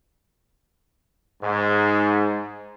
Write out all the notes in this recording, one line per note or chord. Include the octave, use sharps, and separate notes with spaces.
G#2